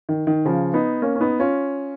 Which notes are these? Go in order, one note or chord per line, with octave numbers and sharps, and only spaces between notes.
D#3
D#3
C#3 F3
B3 D#4
A#3 C#4
C#4
B3 D#4
C#4 F4